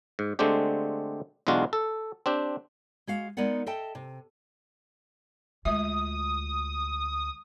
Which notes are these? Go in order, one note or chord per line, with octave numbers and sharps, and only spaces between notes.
G#2
D3 G#3 A3 C4 D4 G4
B1 E2 G#3 D4 F4 F#4
A4
C4 D4 G4
G#3 F#4 F5
G#3 B3 D#4 A#4 D5 F#5
A4 D#5 E5 G5 A5
C3
D2 G#3 F4 E5 D#6